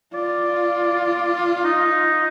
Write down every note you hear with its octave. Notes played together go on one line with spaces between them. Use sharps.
F4 D5
D#4